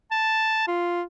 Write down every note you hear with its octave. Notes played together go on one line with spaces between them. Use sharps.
A5
F4